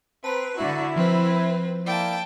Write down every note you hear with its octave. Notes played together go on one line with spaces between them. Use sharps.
C4 B4 A5 A#5 C7
D3 E4 F#4
F3 C4 B4
A#3 E4 D5 G5 A5